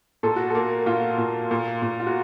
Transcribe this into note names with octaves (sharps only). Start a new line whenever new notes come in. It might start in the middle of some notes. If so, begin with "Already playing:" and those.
A#2 A4
F#4
A#3 A4
A#2 F4
A#2
A#2
A#2
F4
F#4